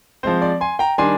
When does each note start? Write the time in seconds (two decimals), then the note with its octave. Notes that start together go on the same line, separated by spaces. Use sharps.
0.23 F3 G#3 C4 C5
0.42 D5
0.61 G#5 C6
0.79 G5 A#5
0.98 D#3 G3 D4 G#5 C6